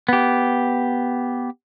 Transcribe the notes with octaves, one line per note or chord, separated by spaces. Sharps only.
B3 G4